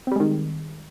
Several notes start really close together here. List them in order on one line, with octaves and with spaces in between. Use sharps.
C4 G3 G#3 D#3